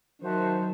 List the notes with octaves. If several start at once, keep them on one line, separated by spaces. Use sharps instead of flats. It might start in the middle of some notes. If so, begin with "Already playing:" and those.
D#3 F#3 F#4 C5 E5 A5